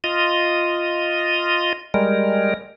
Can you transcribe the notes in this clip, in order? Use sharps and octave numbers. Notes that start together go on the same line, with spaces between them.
F4 D#5
G3 G#3 A#4